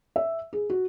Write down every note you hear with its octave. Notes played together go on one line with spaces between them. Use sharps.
E5
G#4
F#4